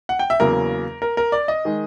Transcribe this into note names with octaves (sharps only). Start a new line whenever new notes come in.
F#5
G5
E5
E2 C#3 F#3 A#3 A#4
A#4
A#4
D5
D#5
D#3 G#3